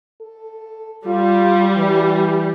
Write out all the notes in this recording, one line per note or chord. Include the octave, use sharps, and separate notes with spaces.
A4
G3 F4
E3